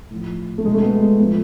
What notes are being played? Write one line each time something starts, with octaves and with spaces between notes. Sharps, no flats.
A2 F3
A3
B2 G#3
A3
G#3 B3
G#3 B3
A2 F3 G#3 B3